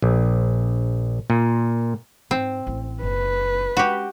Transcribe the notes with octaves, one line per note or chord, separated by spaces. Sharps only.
A#1
A#2
G#2 C4
A1 A3
F#1 B4
G#3 C#4 F#4 G4